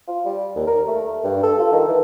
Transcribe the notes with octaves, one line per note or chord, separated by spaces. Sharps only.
F4
G3
D#2
A#4
A3
G2
A4
F4
D#3
E3